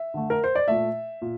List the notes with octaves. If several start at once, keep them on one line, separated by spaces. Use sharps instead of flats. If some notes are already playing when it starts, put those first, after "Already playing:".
Already playing: E5
D3 A3
A#4
C5
D5
A#2 A3 E5
A#2